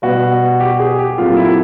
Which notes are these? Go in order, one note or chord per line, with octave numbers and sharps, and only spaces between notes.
B2 G3 B3 F#4
G4
G#4
G4
A#2 F#3 A3 C4 F4
E4